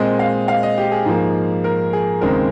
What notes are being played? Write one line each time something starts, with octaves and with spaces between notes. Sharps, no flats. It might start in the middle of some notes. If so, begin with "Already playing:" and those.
Already playing: A#2 G#3 C4 D#5
F5
F5
D#5
G4
G#4
G#2 F3 A#3
A#4
G#4
D#2 C#3 G#3 C4 A#4